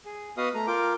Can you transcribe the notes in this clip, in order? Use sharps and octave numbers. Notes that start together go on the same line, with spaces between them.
G#4
B3 F#4 B4 D#5 F5 D#6
A3 A#5
F4 A#4 G5 D6